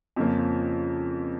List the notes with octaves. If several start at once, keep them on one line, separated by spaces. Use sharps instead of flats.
F2 C#3 F3 A#3 C#4